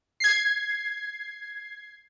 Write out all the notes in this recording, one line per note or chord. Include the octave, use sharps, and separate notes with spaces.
G#6 C7